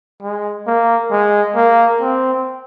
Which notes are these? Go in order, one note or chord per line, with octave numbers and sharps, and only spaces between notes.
G#3
A#3
G#3
A#3
C4